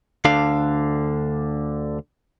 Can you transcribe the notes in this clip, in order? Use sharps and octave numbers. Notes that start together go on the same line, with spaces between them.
D2 D3 D4 F5